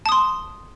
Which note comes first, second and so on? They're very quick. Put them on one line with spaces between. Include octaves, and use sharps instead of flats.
A5 D#6 C6